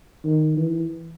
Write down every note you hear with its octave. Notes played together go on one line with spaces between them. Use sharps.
D#3
E3